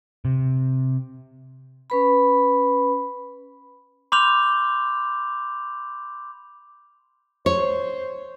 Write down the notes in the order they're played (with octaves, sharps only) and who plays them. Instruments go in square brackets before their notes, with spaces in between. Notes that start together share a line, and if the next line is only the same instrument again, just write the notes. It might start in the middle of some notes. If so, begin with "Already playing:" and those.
[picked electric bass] C3
[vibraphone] C#4 B4 B5
[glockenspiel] B5 C6 D6 F6 G6 F7
[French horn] C5 [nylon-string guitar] C#5